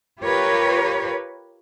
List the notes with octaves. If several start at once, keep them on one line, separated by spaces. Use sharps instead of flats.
F4 G4 A#4 B4 C#5